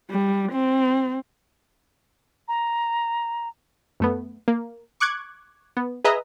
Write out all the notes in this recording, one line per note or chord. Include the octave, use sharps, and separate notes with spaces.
G3
C4
A#5
F#2 A3 B3
A#3
C#6 D6 F#6 G#6
B3
G#4 B4 D#5 E5 A#5